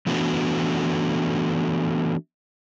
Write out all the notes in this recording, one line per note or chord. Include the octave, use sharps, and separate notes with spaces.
E3 A3 B3 D4 F#4